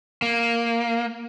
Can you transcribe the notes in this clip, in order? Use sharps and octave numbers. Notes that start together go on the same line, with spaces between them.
A#3